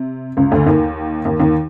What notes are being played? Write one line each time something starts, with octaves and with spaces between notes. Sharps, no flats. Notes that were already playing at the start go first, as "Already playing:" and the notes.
Already playing: C3
C#2 C#3
D2 D3
D#2 D#3
D#2 D#3
D#2 D#3